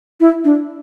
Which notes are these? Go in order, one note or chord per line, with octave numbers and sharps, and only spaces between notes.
E4
D4